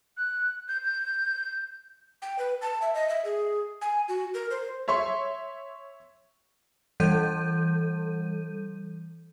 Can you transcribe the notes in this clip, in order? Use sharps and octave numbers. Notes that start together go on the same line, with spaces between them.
F#6
G6
G6
G5
B4
A5
E5
D#5
E5
G#4
G#5
F#4
A#4
C5
C#5 E5 C6 C#6
E3 G3 A4 G6 D#7